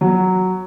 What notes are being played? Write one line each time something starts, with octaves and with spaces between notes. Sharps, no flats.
F#3